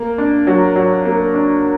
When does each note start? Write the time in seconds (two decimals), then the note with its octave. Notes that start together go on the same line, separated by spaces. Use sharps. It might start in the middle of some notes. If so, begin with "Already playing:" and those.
Already playing: A#3
0.18 D4
0.47 F#3
0.76 F#3
1.05 A#3
1.34 D4